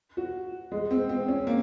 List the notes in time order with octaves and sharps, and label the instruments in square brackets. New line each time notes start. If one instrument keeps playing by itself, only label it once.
[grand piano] F#4
G#3
C4
C4
C#4
A#3